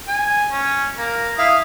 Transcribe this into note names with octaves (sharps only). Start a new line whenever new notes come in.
G#5
C#4
A#3
E4 F5 D#6